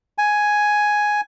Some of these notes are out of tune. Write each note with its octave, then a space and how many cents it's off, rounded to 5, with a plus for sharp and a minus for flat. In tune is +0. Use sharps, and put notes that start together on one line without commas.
G#5 +5